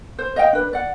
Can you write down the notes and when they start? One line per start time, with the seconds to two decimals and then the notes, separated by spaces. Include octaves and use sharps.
0.18 C5
0.36 D#5 F5 G5
0.53 D4 B4
0.73 D5 F#5